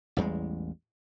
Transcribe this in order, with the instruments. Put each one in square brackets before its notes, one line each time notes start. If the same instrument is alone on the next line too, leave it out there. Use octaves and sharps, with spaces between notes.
[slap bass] A1 E2 G3 G#3